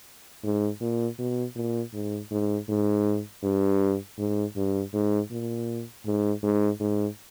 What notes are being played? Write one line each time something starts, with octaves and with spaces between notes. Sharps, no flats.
G#2
A#2
B2
A#2
G#2
G#2
G#2
G2
G#2
G2
G#2
A#2
G#2
G#2
G#2